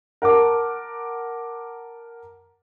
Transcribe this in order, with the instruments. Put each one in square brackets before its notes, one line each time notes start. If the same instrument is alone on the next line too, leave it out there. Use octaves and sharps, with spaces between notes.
[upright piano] A#4 F#5 A5 D6